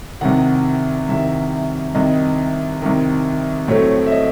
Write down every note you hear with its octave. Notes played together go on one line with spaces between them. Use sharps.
C2 C3 D#3 F#5
C2 C3 D#3 E5
C2 C3 D#3 D#5
C2 C3 D#3
A2 F#3 A3 C4 C#5
E5
D#5